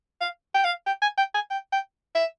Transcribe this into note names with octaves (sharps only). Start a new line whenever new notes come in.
F5
G5
F5
G5
G#5
G5
G#5
G5
G5
E5